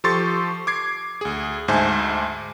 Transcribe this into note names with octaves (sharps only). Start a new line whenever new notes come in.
F3 G4 A4 C6 C#6 A6
D6 G#6 C7
D2 G#4
D2 G#2 C5 E5 G#5 A5